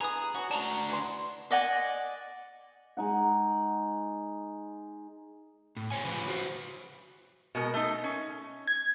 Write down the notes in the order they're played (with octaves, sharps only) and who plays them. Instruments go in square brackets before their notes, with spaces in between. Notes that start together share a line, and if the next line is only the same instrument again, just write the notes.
[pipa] D3 E3 B3 [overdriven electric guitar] G#4 [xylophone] A#5 D#6
[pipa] E3 C#4 [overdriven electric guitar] F#4
[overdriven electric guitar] D4 F#4 [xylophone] A5 A#5
[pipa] E3 C6
[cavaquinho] D5 D#5 F#5 G#5
[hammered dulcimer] G#3 D#4 F#5
[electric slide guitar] A2
C#3 C5 C#5 G#5
C#3 F3 C#4 B4
F#4 B4 C5
[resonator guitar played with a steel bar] B2 G#3 A#4
A3 D#4
C#4
[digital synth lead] G#6